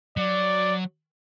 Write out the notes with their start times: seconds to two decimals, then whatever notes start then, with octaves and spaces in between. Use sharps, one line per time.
0.17 F#3 D5